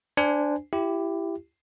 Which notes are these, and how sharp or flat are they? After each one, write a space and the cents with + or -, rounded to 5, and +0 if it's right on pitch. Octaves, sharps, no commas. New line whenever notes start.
D4 +0 C5 -25 G#5 -10
E4 +20 G4 +0